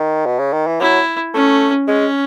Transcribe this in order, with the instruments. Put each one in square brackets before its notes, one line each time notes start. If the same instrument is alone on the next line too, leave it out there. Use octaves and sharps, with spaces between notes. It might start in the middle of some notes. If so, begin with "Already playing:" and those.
Already playing: [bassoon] D#3
B2
C#3
D#3
E3
[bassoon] F#3 [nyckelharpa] E4
[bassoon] A3 [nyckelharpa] C#4
[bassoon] G#3 [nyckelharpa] C#4